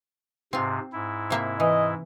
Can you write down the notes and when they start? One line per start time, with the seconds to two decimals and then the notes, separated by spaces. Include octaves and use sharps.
0.53 G#2 C3 C4 F4
0.93 G#2 E4
1.30 C3 A#3 E5
1.60 E3 D#5